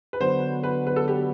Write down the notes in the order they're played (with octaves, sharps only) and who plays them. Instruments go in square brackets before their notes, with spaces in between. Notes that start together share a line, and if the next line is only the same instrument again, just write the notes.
[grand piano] B4
[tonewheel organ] D3 F#3 B3 [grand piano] C5
[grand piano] B4
B4
A4
G4